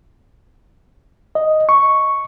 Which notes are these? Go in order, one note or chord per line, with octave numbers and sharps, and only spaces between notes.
D#5
C#6